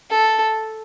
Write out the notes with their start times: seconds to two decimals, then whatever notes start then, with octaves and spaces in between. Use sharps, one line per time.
0.10 A4